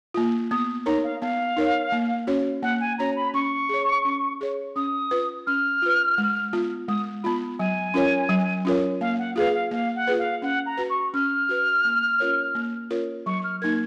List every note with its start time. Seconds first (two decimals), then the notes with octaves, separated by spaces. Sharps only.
0.14 A#3 F4
0.51 B3 D#6
0.86 D#4 A#4 C#5 A#5
1.04 F5
1.21 B3 F5
1.57 D#4 A#4 C#5
1.92 A#3
2.27 C#4 F#4 C#5
2.63 A#3 F#5
2.80 G#5
2.98 C#4 F#4 C#5 A#5
3.16 B5
3.34 C#4 C#6
3.69 G#4 C#5
4.05 C#4
4.41 G#4 C#5
4.76 C#4 D#6
5.11 F4 B4
5.47 C#4 F6
5.82 F4 B4
6.18 G#3
6.53 B3 F4
6.88 G#3 D#6
7.24 B3 F4 B5
7.59 F#3 G#5
7.94 C#4 F4 A#4 C#5
8.29 F#3
8.65 C#4 F4 A#4 C#5
9.01 A#3 F5
9.19 F#5
9.36 F4 G#4 B4 F5
9.54 F5
9.71 A#3 F5
9.96 F#5
10.07 F4 G#4 B4
10.19 F5
10.42 C#4 F#5
10.66 A#5
10.77 F#4 B4
10.90 C#6
11.13 C#4 F6
11.49 F#4 B4
11.85 A#3
12.20 C#4 F4 A#4 C#5
12.55 A#3
12.90 C#4 F4 A#4 C#5
13.26 F#3 C#6
13.44 F6
13.61 A#3 D#4 A#4 G#6